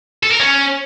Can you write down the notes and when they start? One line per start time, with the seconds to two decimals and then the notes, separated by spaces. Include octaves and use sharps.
0.23 A4
0.31 A#4
0.40 C#4